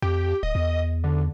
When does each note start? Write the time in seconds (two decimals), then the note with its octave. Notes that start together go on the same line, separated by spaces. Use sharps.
0.02 F2 G4
0.43 D1 D#5
0.55 E2
1.04 D3